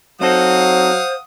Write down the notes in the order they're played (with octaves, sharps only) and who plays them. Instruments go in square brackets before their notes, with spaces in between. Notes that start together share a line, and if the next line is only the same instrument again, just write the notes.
[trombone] F#3 [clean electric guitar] C4 D#4 A4 [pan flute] C5 [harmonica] F5 F#5 D#6